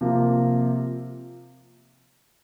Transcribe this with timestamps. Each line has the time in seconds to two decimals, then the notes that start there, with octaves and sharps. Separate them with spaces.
0.01 C3 F3 A#3 F4